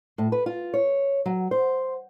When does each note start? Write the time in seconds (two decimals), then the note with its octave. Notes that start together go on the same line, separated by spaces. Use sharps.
0.18 A2
0.32 B4
0.46 F4
0.74 C#5
1.26 F#3
1.51 C5